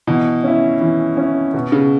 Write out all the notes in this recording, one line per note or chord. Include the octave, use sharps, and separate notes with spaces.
B2 E3
C#4 E4
E3
C#4 E4
B2
C#3